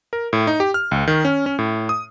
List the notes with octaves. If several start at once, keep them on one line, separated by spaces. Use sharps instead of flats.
A#4
A2
D#4
G4
F6
C#2
D#3
C#4
C#4
A2
D#6